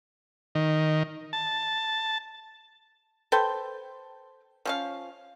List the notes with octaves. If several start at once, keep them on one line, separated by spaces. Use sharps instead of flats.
D#3
A5
A4 B4 C5 G5
F3 C#4 F5